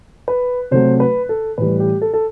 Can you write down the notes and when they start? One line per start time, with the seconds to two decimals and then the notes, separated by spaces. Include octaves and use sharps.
0.28 B4
0.71 C3 F#3 A3 C5
1.00 B4
1.29 A4
1.58 A2 E3 G3 B4
1.80 G4
2.02 A4
2.14 A4